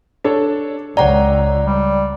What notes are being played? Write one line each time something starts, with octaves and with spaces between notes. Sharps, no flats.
D4 A4 C#5
C#2 C#5 D5 F#5 G5 A#5
G3